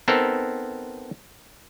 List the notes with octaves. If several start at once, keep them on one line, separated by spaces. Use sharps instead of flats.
B3 C4 D#4 A4 A#4